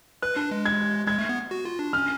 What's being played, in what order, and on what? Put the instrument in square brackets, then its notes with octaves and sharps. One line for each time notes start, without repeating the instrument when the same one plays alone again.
[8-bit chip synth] B4 [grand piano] F#6
[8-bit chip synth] D4
G#3
[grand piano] G#6
[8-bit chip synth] G#3 [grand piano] G#6
[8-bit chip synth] A3
B3
F#4
F4
D4
[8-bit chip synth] C#4 [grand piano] F6